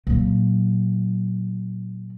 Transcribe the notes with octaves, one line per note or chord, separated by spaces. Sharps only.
A#2 F#3